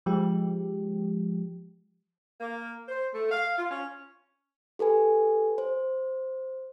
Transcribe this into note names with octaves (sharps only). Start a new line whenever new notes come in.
F3 G#3 G4
A#3
C5
A3
F5
F4
C#4
G4 A4 B4 G#5
C5